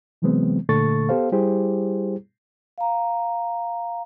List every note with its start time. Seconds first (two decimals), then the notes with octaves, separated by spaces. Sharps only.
0.22 C3 E3 F#3 G#3 B3 C4
0.69 A#2 D3 A3 A4 C#6 A6
1.09 B3 G4 A4 C5 F5
1.32 G3 E4 G4 G#4 C5
2.78 F5 A#5